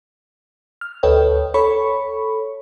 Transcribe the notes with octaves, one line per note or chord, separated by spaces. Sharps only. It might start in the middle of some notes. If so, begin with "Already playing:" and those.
F6
D2 A4 B4 C#5 D#5 G5
A4 C#5 B5 C#6